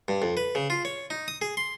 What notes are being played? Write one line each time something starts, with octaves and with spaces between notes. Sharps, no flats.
G2
F2
B4
C#3
F4
C#5
D#4
D#6
G#4
C6